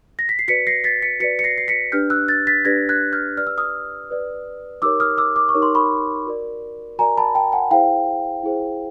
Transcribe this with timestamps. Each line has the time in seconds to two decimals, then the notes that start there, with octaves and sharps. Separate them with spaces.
0.19 A#6
0.29 B6
0.39 C7
0.48 F#4 B4 D5 B6 C#7
0.67 A#6 C7
0.84 A6 B6
1.02 B6 C#7
1.20 F#4 B4 D5 B6 C#7
1.39 C#7
1.44 A#6 C7
1.58 C7
1.68 B6 C#7
1.92 D4 G4 B4 D5 F6 G6
2.10 E6 F#6
2.28 G6 A6
2.47 A6 B6
2.65 D4 G4 B4 D5 G#6 A#6
2.89 F#6 G#6
3.13 F6 G6
3.37 G4 B4 D5 F6
3.47 E6
3.58 D#6 F6
4.09 G4 B4 D5
4.82 D#4 G4 A#4 C#5 D6 E6
5.00 D#6 F6
5.17 D6 E6
5.36 D6
5.49 C#6
5.54 D#4 G4 A#4 C#5
5.62 C6
5.75 B5 C#6
6.26 F#4 A#4 D5
6.98 F#4 A#4 D5 G#5 A#5
7.17 A5 B5
7.35 G5 A5
7.52 F#5 G#5
7.71 E4 G#4 C5 F5 G5
8.43 E4 G#4 C5